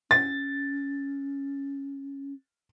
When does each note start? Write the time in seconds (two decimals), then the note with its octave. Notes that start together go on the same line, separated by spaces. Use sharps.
0.11 C#4 A6